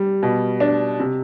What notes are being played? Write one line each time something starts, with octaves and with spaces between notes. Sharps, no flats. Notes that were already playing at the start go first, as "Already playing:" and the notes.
Already playing: G3
B2
D4
C3